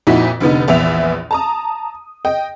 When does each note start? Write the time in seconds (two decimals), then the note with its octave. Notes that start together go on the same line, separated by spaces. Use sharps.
0.07 F2 A#2 D#4 E4 F#4 B6
0.40 F1 D3 B3 D#4
0.68 A#1 E2 B3 E5 F7
1.31 A5 A#5 D#6
2.25 D#5 G5